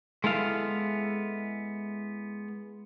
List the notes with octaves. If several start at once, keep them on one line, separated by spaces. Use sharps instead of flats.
G#3 B3 E4 A4 F5